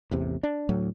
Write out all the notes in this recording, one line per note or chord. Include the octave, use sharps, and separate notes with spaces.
A1 E2 C3
D4
D2 A2 F#3